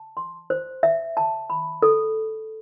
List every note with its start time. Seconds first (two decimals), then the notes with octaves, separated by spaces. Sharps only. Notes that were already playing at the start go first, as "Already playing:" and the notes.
Already playing: A5
0.17 C6
0.50 C5
0.83 E5
1.17 A5
1.50 B5
1.82 A4